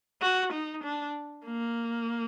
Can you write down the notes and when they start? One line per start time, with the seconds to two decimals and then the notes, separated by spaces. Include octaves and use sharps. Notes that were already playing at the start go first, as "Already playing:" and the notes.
0.22 F#4
0.53 D#4
0.84 D4
1.46 A#3